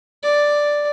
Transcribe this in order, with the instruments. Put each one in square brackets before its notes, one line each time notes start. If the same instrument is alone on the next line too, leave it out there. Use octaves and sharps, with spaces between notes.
[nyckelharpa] D5